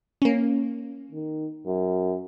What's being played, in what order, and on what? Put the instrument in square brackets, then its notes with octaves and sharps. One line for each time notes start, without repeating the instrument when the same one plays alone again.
[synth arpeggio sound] A#3 C#4
[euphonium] D#3
F#2